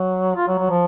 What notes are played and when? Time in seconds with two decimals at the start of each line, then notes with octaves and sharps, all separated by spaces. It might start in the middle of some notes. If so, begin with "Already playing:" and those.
Already playing: F#3
0.36 F4
0.48 F#3
0.59 F#3
0.70 F3